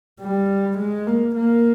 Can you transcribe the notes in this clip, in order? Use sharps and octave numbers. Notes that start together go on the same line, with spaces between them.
G3
G#3
A#3
A#3